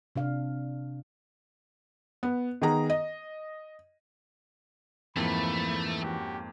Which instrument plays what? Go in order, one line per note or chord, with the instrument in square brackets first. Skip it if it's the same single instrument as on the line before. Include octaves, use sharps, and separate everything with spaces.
[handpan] C3 D4 F5
[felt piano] B3
D#3 B3 G#4 A#5
D#5
[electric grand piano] F2 G#2 A#3 [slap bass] E3 [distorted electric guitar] A3 [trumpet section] B5
[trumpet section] C#4 F#4 G4